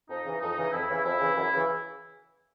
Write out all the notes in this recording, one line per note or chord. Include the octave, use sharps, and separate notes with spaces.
F2 D#4
C#3 E3
F2 D#4
C#3 E3
F2 E4
C#3 E3
F2 E4
C#3 E3
F#2
C#3 E3